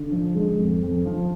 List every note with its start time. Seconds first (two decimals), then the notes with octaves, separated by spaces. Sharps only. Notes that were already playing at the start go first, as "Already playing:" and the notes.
Already playing: D3
0.12 F3
0.35 G#3
0.59 F2
0.83 F2
1.06 F3